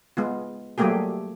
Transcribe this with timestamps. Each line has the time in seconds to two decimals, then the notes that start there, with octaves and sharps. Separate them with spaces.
0.17 G#3 B3 F4
0.78 F#3 G3 A3 A#3 G4 G#4